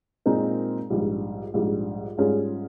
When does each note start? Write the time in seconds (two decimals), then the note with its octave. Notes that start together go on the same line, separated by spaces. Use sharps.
0.26 A#2 G#3 C4 D#4 A#4
0.90 A#1 G#2 G3
1.54 A#1 G#2 G3
2.18 G#2 G3 C#4 F4 G#4